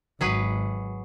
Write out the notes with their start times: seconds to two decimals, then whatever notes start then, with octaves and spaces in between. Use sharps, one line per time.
0.21 G#1 F#3 G#4 B4